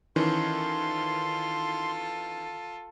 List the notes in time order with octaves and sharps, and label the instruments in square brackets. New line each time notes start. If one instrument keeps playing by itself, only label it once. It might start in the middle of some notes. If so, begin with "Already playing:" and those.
[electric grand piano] D#3 E3 C#4 [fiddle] F4 A4 [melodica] C6